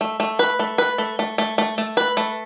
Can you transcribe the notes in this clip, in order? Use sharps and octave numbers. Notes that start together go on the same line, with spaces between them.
A3
A3
B4
A3
B4
A3
A3
A3
A3
A3
B4
A3